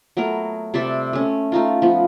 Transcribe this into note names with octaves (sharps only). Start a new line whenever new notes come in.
F#3 A3 B3 A#4
C3 G3 D5 E5
A3 C#4
A3 D#4 F4
F3 B3